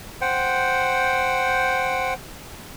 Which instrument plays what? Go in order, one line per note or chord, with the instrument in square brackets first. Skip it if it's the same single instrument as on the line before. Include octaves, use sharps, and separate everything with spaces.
[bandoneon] C5 F#5 G5